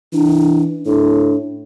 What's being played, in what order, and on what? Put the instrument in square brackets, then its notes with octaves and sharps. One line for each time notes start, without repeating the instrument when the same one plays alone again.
[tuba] E3 [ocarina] D4
[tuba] A2 [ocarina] D4